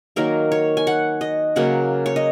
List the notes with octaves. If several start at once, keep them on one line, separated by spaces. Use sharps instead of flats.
D#3 F#3 A#3 A#4
C#5
G#5
F#5
D#5
C#3 F#3 A#3 F#5
C#5
D#5